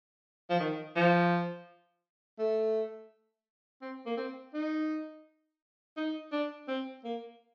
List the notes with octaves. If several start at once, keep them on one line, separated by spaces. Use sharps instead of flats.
F3
D#3
F3
A3
C4
A#3
C4
D#4
D#4
D4
C4
A#3